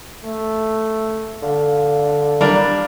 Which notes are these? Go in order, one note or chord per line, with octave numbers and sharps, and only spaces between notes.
A3
D3 F5
G3 D4 A#4